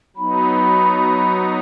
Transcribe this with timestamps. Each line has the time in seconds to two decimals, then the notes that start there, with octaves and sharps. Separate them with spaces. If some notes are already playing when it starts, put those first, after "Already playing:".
0.16 F#3 B3 D#4 B5